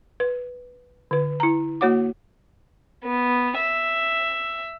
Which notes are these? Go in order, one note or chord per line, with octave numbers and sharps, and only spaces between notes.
B4
D3 B4
E4 A#5
A#3 F#4 C#5 F#5 D6
B3
E5